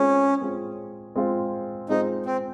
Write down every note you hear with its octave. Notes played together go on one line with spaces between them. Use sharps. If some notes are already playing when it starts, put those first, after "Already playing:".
Already playing: G#3 C4 C#4 F4 G#4 C5
G#3 C4 F4 G#4 C5
G#3 C4 F4 G#4 C5
G#3 C4 D#4 F4 G#4 C5
C4